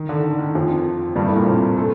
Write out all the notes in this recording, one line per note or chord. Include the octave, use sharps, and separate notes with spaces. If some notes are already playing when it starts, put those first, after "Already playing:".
Already playing: D#3
D3
D3
D#3
F2 F3
G2 G3
A2 A3
A#2 A#3
C3 C4
A3 A4